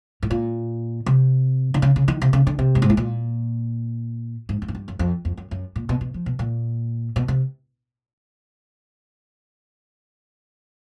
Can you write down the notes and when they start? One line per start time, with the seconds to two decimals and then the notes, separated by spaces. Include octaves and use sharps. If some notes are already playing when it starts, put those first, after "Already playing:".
0.23 A2
0.31 A#2
1.06 C3
1.74 D3
1.82 C#3
1.96 C#3
2.08 D#3
2.22 C3
2.33 C#3
2.47 D3
2.59 C3
2.75 G2
2.82 G#2
2.90 A2
2.97 A#2
4.49 G#2
4.62 G2
4.68 G#2
4.75 G2
4.88 F#2
4.99 F2
5.25 F2
5.37 F#2
5.51 F#2
5.76 A#2
5.89 B2
6.01 B2
6.14 F3
6.26 B2
6.39 A#2
7.16 B2
7.28 C3